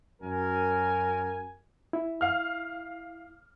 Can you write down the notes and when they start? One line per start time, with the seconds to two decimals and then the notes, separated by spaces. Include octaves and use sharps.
0.22 F#2 A#4 G#5
1.93 E4
2.21 F5 F6